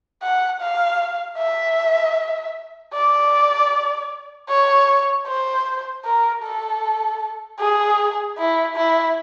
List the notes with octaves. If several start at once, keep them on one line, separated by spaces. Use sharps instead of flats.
F#5
F5
E5
D5
C#5
C5
A#4
A4
G#4
E4
E4